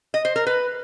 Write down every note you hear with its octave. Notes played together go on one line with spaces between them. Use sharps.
D#5
C5
A#4
B4